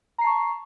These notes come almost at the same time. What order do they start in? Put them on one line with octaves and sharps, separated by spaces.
A#5 C7 A5 C#6